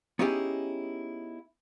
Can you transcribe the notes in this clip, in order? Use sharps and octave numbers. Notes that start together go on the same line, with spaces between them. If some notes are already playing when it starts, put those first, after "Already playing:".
B3 C#4 D#4 E4 G4 G#4